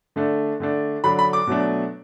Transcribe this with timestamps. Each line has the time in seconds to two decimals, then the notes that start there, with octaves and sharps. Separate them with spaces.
0.16 D3 A3 D4
0.60 D3 A3 D4
1.04 D3 F#3 D4 B5
1.19 B5
1.33 D6
1.47 B2 F#3 A3 D4